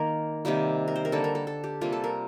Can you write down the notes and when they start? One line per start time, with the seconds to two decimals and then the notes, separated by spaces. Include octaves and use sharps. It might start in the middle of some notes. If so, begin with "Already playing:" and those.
Already playing: D#3 A#3 A#4
0.45 C3 D#3 G3 A#3
0.88 A#4
0.96 C5
1.05 A#4
1.12 D3 G3 A#3 A4
1.24 A#4
1.35 A4
1.47 A4
1.64 G4
1.81 C3 G3 A#3 F4
1.92 A4
2.04 A#4